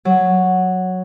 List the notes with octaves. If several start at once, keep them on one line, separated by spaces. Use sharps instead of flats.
F#3